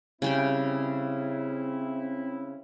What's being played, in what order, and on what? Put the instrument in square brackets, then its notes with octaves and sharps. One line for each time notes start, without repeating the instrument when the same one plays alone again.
[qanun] C#3 G3 G5 [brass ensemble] C4 E4